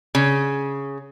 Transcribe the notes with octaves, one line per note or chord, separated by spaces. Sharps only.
C#3